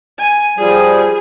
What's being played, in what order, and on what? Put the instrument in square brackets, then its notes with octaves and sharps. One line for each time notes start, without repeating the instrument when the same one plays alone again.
[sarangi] G#5
[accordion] F3 G3 [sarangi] G#4